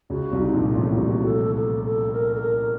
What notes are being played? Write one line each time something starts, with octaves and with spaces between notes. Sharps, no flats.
C#2 C#3 F#4
C2 C3
D#4
A#1 A#2
D#4
F4
A1 A2
C2 C3 F#4
A4
A4
A4
A#4
A4
A#4